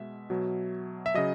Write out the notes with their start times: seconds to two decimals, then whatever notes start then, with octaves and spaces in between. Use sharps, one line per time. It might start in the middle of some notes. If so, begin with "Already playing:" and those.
Already playing: B2 G#3 E5
0.30 B2 F#3
1.06 E5
1.14 C#3 F#3 D#5